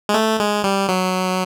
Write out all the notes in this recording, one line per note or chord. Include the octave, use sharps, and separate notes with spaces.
G#3
A3
G#3
G3
F#3